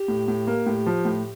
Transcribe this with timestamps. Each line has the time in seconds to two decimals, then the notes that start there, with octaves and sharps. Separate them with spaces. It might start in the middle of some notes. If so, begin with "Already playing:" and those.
Already playing: G4
0.08 A2
0.28 A2
0.47 A#3
0.66 A2 G4
0.86 F3
1.05 A2